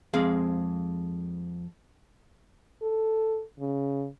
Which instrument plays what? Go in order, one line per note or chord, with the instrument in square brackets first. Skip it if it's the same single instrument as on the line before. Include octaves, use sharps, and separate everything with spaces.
[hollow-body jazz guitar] F2 G#3 C4 G#4 F5
[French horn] A4
C#3